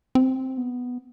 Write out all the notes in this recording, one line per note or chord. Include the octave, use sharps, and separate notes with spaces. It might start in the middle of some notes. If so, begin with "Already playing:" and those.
C4
B3